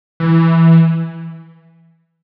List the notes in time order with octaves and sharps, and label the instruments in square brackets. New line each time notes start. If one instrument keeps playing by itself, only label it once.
[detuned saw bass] E3